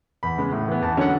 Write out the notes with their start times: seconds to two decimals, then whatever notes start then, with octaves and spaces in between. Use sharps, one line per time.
0.23 E2 B5
0.38 C#3 G#3 B3
0.52 A2
0.68 E3 B3
0.82 E2 A5
0.97 D3 F#3 C#4 F#5